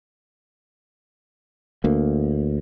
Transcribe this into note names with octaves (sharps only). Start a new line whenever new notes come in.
D2 A#3